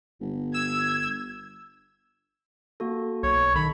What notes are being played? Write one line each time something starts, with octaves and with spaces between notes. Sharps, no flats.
G1
E6 G#6
A#3 F#4 A4
B1 C#5
D#3 A4 B5